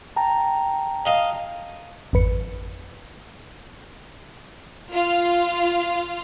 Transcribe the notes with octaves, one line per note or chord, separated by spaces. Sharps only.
G5 A5 A#5
D#5 F5
G#1 F2 B4 C#7
F4